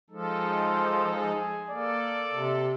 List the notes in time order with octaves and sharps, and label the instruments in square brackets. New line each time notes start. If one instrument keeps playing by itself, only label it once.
[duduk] F3 [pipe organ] G#3 D#4 A4
[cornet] C5
G#4
[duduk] A#3 [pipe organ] A4 [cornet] D5
[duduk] C3